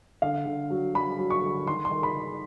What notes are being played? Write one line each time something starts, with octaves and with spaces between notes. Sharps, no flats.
D3 F5
D3
F#3
F#3 B5
F#3
C#6
D3
D#3 C6
C6
D#3
B5
D#3